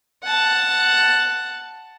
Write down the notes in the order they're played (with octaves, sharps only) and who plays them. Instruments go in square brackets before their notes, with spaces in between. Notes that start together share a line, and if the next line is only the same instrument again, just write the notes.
[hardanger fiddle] F#5 A5